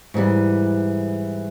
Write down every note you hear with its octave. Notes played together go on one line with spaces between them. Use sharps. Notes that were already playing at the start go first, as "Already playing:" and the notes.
G#2 E3 G3